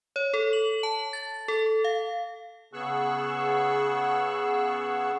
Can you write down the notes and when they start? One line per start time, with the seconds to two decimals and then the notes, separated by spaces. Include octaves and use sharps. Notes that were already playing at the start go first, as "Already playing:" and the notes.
0.16 C#5
0.34 A4
0.53 F#7
0.83 A5
1.13 A6
1.48 A4
1.84 F5
2.73 C#3 B3 G#4 C#6 E6 F#6